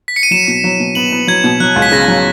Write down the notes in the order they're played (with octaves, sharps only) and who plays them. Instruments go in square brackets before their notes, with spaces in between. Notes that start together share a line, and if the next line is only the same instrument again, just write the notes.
[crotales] B6
C#7
D#7
[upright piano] F#3 [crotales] E7
[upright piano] B2
F#3
B2
[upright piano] B3 [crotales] F#7
[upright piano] B3
[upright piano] F#3 [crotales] G#6
[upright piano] B2
[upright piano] F#3 [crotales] F#6
[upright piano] C#2
[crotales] B6
[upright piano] C#3 [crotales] A#6
[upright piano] F#3